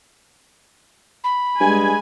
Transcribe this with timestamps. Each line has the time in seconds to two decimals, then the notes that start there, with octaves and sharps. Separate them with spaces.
1.24 B5
1.60 G2 G#3 G#5